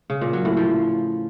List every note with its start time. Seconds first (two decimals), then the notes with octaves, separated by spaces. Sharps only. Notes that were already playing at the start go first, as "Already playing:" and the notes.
0.10 C#3
0.21 A#2
0.33 F#3
0.45 A2
0.57 F3